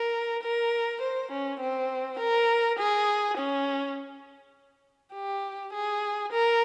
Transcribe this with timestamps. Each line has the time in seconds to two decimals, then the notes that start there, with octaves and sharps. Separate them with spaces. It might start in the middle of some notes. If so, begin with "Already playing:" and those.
Already playing: A#4
0.43 A#4
1.01 C5
1.31 C#4
1.60 C4
2.19 A#4
2.78 G#4
3.37 C#4
5.14 G4
5.73 G#4
6.32 A#4